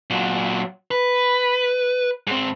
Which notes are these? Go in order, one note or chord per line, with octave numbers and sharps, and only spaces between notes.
A#2 F#3
B4
G#2 C4